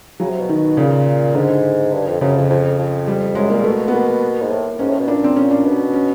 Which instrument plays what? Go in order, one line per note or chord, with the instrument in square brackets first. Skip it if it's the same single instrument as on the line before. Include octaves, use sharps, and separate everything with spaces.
[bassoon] C#3 [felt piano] F#3
[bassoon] C3
B2
[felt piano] D#3
[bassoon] A#2 [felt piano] C#3
[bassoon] G#2 [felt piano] D3
[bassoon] G2
F2
[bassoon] F#2 [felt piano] C#3
[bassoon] F2
F2
F2
[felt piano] G3
[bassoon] F#2 [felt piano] G#3
[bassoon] A#2 [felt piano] A#3
[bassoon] B2 [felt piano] A3
[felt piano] B3
A#3
[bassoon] G#2
A2
[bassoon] G#2 [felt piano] C#4
[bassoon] A2
B2
[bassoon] A#2 [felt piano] D4
[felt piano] C4
C#4
D4
[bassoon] B2
[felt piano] C#4